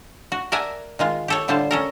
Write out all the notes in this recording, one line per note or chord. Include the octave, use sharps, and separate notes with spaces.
F#4
A#4 D5 E5 F#5 G#5 A5
D#3 G#3 F4
G4 A4 C#5
A2 D3 G3 F4 C5 A5
C#4 A4 A#4